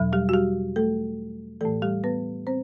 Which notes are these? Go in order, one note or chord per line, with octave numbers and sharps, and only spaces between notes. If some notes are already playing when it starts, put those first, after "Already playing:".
Already playing: E2 B2 F#3
G3 G4
F#4
G3 G4
A3 A4
A2 E3 A3 A4
G3 G4
B3 B4
C4 C5